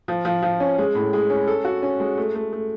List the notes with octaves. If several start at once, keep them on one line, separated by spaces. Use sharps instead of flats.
F3
F3
F3
C#4
G#3
A2
G#3
C#4
A4
F#4
C#4
G#3
A3
A3
A3